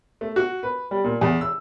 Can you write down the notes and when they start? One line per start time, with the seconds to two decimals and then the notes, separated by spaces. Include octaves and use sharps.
0.21 A3
0.36 F#4
0.63 B4
0.91 G3
1.04 A#2
1.21 E2
1.41 E6